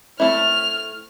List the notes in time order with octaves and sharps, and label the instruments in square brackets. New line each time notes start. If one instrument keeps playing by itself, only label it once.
[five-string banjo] A3 C4 E4 [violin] F6